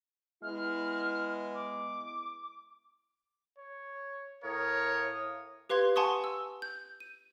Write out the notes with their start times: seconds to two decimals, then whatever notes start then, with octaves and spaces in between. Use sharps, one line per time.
0.42 G#3 B3 E4 F6
1.55 D6
3.59 C#5
4.44 A2 A#4 C#5 F5 D#6
5.70 G4 B4 F5 C6 G#6
5.96 F#5 G#5 A5 C6 C#6 D#6
6.24 E6
6.62 G6
7.00 D#7